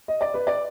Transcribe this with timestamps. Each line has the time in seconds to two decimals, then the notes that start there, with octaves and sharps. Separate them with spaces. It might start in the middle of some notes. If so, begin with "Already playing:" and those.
0.08 D#5
0.21 D5
0.34 B4
0.47 D5